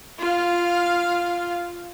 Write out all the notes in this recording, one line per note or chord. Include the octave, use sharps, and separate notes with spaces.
F4 F5